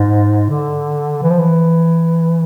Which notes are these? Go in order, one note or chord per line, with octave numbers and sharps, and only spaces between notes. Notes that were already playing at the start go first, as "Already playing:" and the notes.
Already playing: G#2
D3
E3
F3
E3